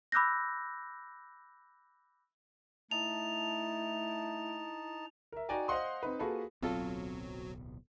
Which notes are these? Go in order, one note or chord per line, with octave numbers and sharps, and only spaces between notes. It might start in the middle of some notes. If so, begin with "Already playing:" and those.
B5 D6 E6 F#6 G6 A#6
A3 D#4 E4 A5 F7
A#4 E5
D#4 F#4 D5 G5 G#5 A#5
C5 D#5 F5 F#5 C6 D#6
C4 D#4 B4
A#3 F4 F#4 G#4 A4 B4
D1 B1 F#3 B3 C4 F4 A4